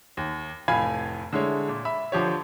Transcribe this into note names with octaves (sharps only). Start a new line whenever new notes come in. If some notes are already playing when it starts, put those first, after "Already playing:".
D#2
F1 A2 F5 G#5 B5 G#6
D3 G#3 E4 C#5
A#2
E5 B5
D3 F3 G4 C#5